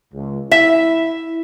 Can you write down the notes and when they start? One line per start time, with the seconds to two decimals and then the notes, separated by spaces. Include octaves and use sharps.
0.14 C#2
0.52 E4 E5